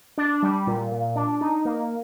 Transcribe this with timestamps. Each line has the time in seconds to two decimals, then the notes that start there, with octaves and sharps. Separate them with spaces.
0.18 D4
0.43 G3
0.67 A#2
0.92 A#2
1.16 D4
1.41 D#4
1.65 A#3